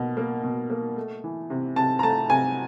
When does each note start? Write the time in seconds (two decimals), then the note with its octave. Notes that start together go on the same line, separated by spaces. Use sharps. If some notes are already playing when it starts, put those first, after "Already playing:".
Already playing: B2 A#3
0.17 A#3
0.43 B2
0.70 A#3
0.96 A3
1.24 E3
1.50 C3
1.76 C3 A5
1.99 A#5
2.03 A3 A5
2.30 C3 G#5